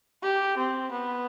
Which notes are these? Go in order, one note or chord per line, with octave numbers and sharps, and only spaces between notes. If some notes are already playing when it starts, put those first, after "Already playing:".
G4
C4
B3